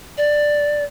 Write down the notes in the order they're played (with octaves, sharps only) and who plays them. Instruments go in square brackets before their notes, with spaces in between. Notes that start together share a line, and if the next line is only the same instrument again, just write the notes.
[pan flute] D5